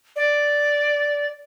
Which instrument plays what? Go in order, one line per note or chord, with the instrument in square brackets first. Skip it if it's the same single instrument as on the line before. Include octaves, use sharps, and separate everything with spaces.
[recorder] D5